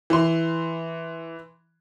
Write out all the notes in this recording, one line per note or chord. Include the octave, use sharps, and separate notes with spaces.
E3 C6